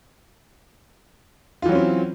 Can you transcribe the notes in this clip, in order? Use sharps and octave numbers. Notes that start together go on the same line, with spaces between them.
E3 F#3 C4 C#4 F4